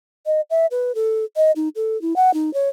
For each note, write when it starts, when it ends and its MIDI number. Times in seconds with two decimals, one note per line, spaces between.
0.26 0.41 75
0.50 0.66 76
0.71 0.95 71
0.95 1.25 69
1.36 1.51 75
1.56 1.69 63
1.76 2.00 69
2.02 2.16 64
2.16 2.33 78
2.34 2.53 63
2.54 2.69 73